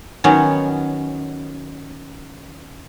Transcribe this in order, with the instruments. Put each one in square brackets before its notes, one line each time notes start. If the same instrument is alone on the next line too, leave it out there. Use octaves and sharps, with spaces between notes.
[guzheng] D#3 F#3 B3 C#4